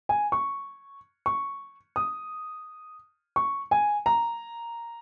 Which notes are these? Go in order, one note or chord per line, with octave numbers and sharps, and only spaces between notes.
G#5
C#6
C#6
D#6
C#6
G#5
A#5